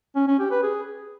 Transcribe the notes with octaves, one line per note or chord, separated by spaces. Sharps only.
C#4
C#4
G4
B4
G#4